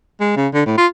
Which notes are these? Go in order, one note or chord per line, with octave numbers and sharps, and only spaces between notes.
G#3
C#3
D3
A2
F4